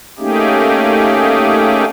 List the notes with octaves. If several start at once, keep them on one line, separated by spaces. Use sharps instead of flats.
A3 A#3 C#4 D#4 G4 G#4